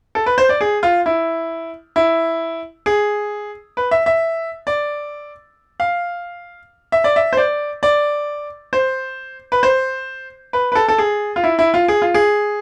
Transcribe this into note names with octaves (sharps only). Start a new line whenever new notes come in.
A4
B4
C5
D5
G#4
F4
E4
E4
G#4
B4
E5
E5
D5
F5
E5
D5
E5
C5
D5
D5
C5
B4
C5
B4
B4
A4
A4
G#4
F4
E4
E4
F4
G#4
F4
G#4